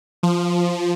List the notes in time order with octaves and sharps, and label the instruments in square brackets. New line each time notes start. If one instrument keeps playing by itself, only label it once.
[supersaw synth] F3